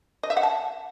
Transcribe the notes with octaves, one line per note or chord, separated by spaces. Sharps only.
D#5
E5
F#5
A5